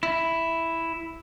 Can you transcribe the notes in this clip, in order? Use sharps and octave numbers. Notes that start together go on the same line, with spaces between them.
E4